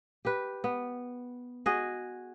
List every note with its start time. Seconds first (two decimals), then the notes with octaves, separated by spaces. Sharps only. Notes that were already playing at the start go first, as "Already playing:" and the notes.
0.25 G4 B4
0.64 B3
1.66 F#4 G#4 D#5